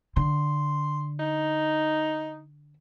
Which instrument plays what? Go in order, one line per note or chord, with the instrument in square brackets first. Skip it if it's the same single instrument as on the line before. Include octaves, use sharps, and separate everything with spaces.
[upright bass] D3 [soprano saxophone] C6
[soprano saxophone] D#4